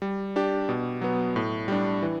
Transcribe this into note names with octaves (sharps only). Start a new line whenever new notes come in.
G3
D4 G4
B2
F#3 B3
A2
G3 D4
E3